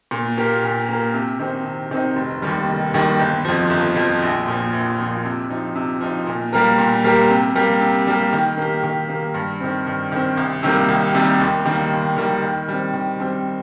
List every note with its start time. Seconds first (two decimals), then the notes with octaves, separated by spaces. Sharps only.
0.11 A#2
0.37 A#3 G4 A#4
0.63 A#2
0.89 A#3 G4 A#4
1.14 C3
1.39 D#3 C4 D#4
1.65 C3
1.91 D#3 C4 D#4
2.16 F1
2.42 D#2 D#3 G3
2.67 F1
2.94 D#2 D#3 G3
3.19 G1
3.45 F2 F3
3.70 G1
3.96 F2 F3
4.22 A#1
4.48 A#2 F3
4.73 A#1
4.99 A#2 F3
5.25 C3
5.50 F3 D#4
5.75 C3
6.01 F3 D#4
6.27 A#2
6.53 G3 A#3 G4 A#4
6.78 A#2
7.04 G3 A#3 G4 A#4
7.30 C3
7.55 G3 A#3 G4
7.81 C3
8.07 G3 A#3 G4
8.33 D#3
8.57 A#3 G4
8.83 D#3
9.09 A#3 G4
9.34 G2
9.60 D#3 C4
9.87 G2
10.12 D#3 C4
10.37 C2
10.63 C3 D#3 G3 A#3
10.89 C2
11.14 C3 D#3 G3 A#3
11.40 D#2
11.66 D#3 G3 A#3
11.92 D#2
12.17 D#3 G3 A#3
12.42 D#3
12.68 G3 C4
12.93 D#3
13.20 G3 C4